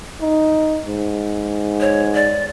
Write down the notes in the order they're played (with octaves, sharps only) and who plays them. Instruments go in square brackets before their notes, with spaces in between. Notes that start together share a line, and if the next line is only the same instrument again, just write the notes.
[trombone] D#4
G#2
[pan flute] C#5
D5